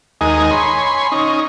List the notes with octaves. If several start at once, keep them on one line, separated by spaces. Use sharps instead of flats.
D#2 G#3 D#4 A#4 D#5 G#5
C#5 G#5 B5 C6
C#4 D#4